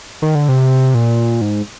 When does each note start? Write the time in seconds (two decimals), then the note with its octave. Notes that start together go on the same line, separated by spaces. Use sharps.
0.22 D#3
0.35 D3
0.49 C3
0.95 A#2
1.41 G#2